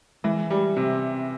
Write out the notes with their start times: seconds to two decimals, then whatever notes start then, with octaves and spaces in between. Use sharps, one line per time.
0.24 E3 G#3
0.50 G3
0.77 C3